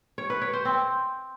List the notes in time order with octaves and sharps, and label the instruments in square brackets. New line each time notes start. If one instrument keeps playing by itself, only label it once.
[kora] C#5
B4
C#5
C5
C4